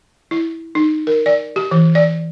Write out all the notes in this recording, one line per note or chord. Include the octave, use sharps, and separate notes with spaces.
E4
D#4
A#4
D5
G4
E3
D5